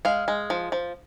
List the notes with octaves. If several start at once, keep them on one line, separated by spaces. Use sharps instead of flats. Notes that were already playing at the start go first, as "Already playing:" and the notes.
G#3 F5
G#3
F3
F3